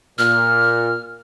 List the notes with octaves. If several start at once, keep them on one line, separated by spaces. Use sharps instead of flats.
A#2 F6